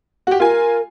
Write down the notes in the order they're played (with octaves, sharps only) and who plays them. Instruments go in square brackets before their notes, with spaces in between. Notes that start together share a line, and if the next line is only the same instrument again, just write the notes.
[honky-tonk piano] F#4 G4
[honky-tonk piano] F4 G#5 [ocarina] A#4